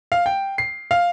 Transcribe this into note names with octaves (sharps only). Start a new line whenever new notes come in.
F5
G5
C7
F5